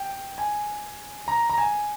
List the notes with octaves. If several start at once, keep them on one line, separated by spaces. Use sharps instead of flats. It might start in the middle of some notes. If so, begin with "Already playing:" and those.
Already playing: G5
G#5
A#5
A#5
G#5